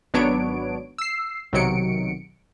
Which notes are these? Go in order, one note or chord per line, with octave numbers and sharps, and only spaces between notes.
G#1 F#3 B3 D4 C#5 D7
E6 C7
B1 C3 D#3 F#3 C#7 D7